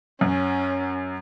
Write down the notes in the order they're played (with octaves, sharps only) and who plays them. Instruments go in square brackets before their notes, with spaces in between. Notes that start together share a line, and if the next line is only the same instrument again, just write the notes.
[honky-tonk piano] F#2 [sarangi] C#4